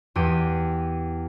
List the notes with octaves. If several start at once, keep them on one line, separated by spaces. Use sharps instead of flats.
E2 G4 D#7